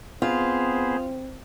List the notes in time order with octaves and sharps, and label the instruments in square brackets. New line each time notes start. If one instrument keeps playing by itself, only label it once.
[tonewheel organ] B3 [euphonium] C4 [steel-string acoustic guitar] F4 [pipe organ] G#4 C5